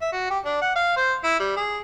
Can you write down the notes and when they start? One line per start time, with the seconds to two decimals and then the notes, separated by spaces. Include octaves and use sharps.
0.01 E5
0.13 F#4
0.30 G4
0.45 D4
0.62 F#5
0.75 F5
0.96 C5
1.24 E4
1.40 G3
1.57 G#4